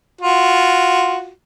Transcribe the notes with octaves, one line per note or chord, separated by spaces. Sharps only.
F4 F#4